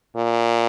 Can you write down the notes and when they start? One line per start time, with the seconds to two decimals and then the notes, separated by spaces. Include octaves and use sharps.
0.16 A#2